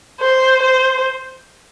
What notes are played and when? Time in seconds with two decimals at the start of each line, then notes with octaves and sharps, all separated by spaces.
0.20 C5
0.62 C5